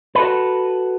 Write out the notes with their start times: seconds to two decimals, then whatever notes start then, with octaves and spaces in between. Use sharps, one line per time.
0.15 F#4 A4 B4